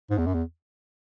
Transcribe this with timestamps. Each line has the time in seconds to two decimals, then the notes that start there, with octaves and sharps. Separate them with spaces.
0.10 G#2
0.18 E2
0.26 F#2
0.34 E2